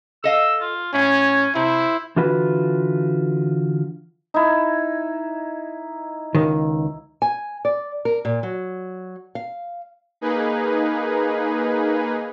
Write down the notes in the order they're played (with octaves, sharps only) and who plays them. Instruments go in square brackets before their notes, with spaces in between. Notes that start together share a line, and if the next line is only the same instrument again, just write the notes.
[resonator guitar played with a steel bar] A4 D#5 F5 [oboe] E6
[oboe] F4
[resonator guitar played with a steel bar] A2 [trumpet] C#4 [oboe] G#5
[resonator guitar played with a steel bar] C3 [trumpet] E4 [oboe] C5
[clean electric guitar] D3 E3 F4 F#4 B4
[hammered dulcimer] D#4 E4
[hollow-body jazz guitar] C#2 D#3
[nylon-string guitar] G#5
D5
A#4
A#2
F#3
F5
[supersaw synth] A#3 D#4 G#4 B4